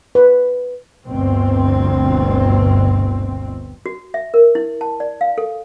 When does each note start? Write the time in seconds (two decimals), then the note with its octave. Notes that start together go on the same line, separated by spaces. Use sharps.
0.15 B4
1.05 G1 D2 G2 B2 C4
3.86 F#4
4.14 E5
4.34 A#4
4.55 E4
4.81 A5
5.00 D5
5.21 F5
5.38 A4